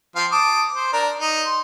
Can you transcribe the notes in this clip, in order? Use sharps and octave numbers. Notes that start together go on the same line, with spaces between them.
F3 C4 F5
A5 D6 D#6
C5
D4 A#4
D#4
C6